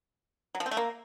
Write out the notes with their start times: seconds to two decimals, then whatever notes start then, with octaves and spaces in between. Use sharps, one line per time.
0.55 F#3
0.60 F3
0.66 C4
0.71 A3
0.77 A#3